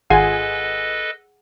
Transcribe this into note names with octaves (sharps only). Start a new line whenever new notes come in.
G#1 F4 G#4 A4 B4 D#5 F#5 G#5